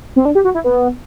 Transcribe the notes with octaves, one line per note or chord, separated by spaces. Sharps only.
C4
D4
G4
F#4
E4
B3